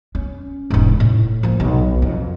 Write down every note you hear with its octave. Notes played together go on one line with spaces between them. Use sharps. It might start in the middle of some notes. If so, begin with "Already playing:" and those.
C#4
E1 G#2
A2
F3 A#3
B1
F2